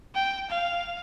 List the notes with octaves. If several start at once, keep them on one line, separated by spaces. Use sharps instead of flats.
G5
F5